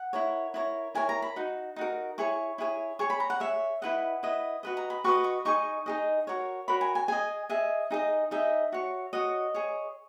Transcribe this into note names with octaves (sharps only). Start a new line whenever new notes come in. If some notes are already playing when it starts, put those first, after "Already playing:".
Already playing: F#5
E4 A#4 C#5
E4 A#4 C#5
E4 A#4 C#5 G#5
A#5
B5
D#4 F#4
D#4 F#4 A#4
E4 G#4 C#5 C#6
E4 G#4 C#5
G#4 C#5 C#6
B5
A#5
F#5
G#4 C#5 E5
E4 B4 D#5 F#5
E4 B4 D#5
F#4 B4 D#5
A#5
B5
F#4 B4 D#5 C#6
C#6
D#4 G#4 D#5 C#6
D#4 G#4 D#5
F#4 A#4 C#5
F#4 A#4 C#5 B5
G#5
G#5
G#4 D#5 G#5
G#4 D#5 E5
D#4 G#4 D#5
D#4 G#4 D#5 E5
F#4 C#5
F#4 C#5 D#5
G#4 C#5